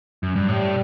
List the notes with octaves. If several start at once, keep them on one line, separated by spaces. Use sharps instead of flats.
F#2
G2
A2 G3